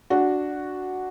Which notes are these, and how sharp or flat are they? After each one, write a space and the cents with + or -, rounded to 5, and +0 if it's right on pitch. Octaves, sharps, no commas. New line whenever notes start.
D4 +0 F#4 +0